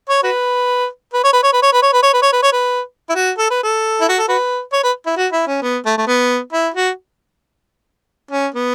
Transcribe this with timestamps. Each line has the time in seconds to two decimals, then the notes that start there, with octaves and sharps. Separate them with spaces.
0.09 C#5
0.23 F#4 B4
1.13 B4
1.24 C#5
1.33 B4
1.43 C#5
1.53 B4
1.62 C#5
1.72 B4
1.82 C#5
1.93 B4
2.03 C#5
2.13 B4
2.22 C#5
2.33 B4
2.42 C#5
2.52 B4
3.09 E4
3.15 F#4
3.38 A4
3.51 B4
3.63 A4
4.01 E4
4.09 F#4
4.19 A4
4.28 F#4 B4
4.72 C#5
4.84 B4
5.06 E4
5.17 F#4
5.32 E4
5.47 C#4
5.62 B3
5.85 A3
5.98 A3
6.07 B3
6.53 E4
6.74 F#4
8.31 C#4
8.55 B3